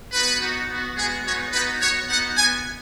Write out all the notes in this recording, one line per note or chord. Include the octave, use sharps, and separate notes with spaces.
B3 D#4 F#4 B4
B3 D#4 F#4
B3 F#4
G#3 B3 F#4 G#4
G#3 B3 D#4 F#4 C#5
B3 D#4 F#4 B4
B3 F#4 C#5
B3 D#4 F#4 F#5
B3 F#4 G#5